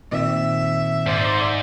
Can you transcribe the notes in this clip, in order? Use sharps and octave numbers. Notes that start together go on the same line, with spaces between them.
A#2 D#3 C4 E5
G#2 C5 D5